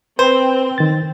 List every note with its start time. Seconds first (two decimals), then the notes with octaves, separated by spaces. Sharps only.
0.19 C4 B4 C5
0.78 D#3 A6